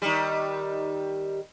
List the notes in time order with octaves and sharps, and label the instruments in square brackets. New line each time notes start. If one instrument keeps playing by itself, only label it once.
[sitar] D#3 G3